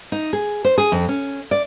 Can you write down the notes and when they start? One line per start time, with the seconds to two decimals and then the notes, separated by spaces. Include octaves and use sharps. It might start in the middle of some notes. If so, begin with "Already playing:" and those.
0.12 D#4
0.33 G#4
0.65 C5
0.78 G#4
0.92 F2
1.09 C#4
1.51 D5